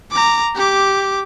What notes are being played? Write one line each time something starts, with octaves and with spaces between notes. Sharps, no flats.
A#5 D6
G4 D6